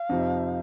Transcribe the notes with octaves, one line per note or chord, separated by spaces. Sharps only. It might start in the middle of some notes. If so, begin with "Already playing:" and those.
Already playing: F5
F2 C3 F3 D#4